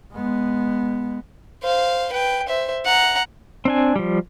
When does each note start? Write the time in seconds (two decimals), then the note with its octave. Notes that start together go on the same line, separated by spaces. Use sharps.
0.13 G#3 B3
1.63 C5 F5
2.12 B4 G5
2.47 C5 E5
2.85 F#5 A#5
3.65 C4 D4 G#5
3.96 F3 G3